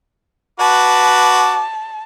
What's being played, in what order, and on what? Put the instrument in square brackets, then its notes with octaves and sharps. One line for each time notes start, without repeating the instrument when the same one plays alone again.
[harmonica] F#4 B4 D6 [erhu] A5